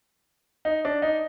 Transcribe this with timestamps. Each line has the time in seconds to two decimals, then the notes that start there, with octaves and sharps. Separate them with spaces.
0.65 D#4
0.85 D4
1.02 D#4